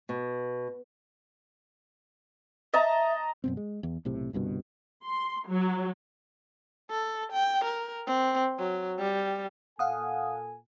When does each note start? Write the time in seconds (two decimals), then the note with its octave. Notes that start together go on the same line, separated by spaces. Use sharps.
0.09 B2
2.73 D#5 E5 A5 A#5
3.44 F#2 B2 C4
3.57 G#3
3.83 E2
4.05 B1 A2 C3
4.33 G1 C2 G2 B2
5.04 C6
5.48 F#3
6.90 A4
7.32 G5
7.64 A#4
8.07 C4
8.59 F#3
8.99 G3
9.79 A#2 A4 F5 F#5 G#5 D#6